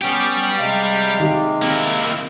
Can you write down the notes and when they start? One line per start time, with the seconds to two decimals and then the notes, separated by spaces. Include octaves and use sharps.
0.02 G3 B3 C#4 G4 G5
0.59 C3 G#3 F5
1.20 D#3 G4
1.62 A#3 C4 E4